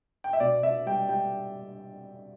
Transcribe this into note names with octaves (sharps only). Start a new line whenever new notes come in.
G5
E5
B2 D5
B2 E5
G3 G5
G3 G5